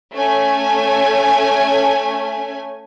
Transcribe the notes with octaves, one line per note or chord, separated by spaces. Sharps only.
A3 C#4 G#5